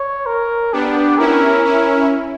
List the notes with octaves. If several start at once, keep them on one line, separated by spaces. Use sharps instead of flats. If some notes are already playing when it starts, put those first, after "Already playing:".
Already playing: C#5
A#4
B3 D4 G4
C#4 E4 A#4
C#4 E4